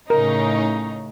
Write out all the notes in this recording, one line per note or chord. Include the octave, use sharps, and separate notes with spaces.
A2 C#3 D#4 A#4